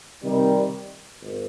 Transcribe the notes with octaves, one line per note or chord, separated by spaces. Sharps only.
C3 D#3 G3
G#1